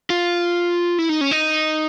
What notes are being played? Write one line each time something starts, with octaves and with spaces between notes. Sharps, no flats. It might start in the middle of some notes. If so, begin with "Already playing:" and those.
F4
E4
D#4
C#4
D#4